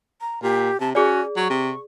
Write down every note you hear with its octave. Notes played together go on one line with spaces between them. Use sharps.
A#5
A#2 G4
C3 A5
C#4 F#4 G#4 D5
F#3 C#6
C3